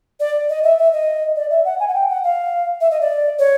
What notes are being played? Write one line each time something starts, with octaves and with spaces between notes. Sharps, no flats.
D5
D#5
E5
E5
D#5
D5
E5
F#5
G#5
F#5
G5
F#5
F5
E5
D#5
D5
C#5